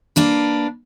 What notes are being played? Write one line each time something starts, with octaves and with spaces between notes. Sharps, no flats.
A#3 D4 B4